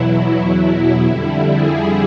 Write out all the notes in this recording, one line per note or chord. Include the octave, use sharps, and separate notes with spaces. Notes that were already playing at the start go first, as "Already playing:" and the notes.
Already playing: E2 B2 F#3 E4
F2 D3 G3 E4
G#4